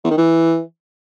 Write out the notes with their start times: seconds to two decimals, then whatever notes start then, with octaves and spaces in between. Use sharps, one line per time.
0.04 E2
0.11 D#3
0.17 E3